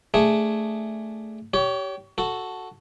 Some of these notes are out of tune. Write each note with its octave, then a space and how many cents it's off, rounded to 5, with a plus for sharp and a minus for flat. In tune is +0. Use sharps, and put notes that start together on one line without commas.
A3 +0 D4 +0 G#4 +0
G4 -20 C#5 +25
F#4 +0 A4 +0